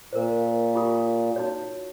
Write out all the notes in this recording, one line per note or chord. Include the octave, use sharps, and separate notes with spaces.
A#2 A#4 C5
F4 G4 D#6
D#4 F#4 C#5